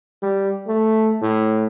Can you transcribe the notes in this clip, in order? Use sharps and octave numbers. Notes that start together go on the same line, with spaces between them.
G3
A3
A2